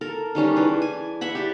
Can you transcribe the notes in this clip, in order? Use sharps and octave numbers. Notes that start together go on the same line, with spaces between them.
A4 A#4
D#3 G3 C#4 D4
E3 D4 G#4
G#5
E5 F#5 B5
G4 D5